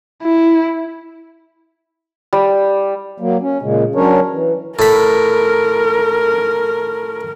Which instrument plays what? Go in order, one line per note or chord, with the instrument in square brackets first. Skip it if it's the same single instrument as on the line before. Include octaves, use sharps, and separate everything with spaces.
[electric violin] E4
[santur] G3
[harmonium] F#3 A#3
C#4
A#2 C#3 G#3
F#3 C#4 D4 A#4 C#5
E3
[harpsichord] A2 B5 [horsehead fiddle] A#4